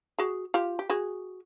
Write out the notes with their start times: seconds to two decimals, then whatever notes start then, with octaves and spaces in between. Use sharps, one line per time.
0.19 F#4 G#4
0.54 F4 G4
0.79 G4
0.90 F#4 G#4